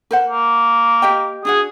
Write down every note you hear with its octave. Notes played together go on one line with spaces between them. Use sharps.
A#4 C5 F#5
A#3
G4 D#5 G5
D4 F#4 G#4 F#5